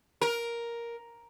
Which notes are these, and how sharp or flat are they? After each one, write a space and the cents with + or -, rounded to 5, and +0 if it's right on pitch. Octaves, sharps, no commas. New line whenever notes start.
A#4 +5